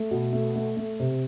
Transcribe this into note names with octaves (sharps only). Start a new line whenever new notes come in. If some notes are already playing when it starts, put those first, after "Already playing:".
Already playing: A3
B2
A3
A3
A3
C3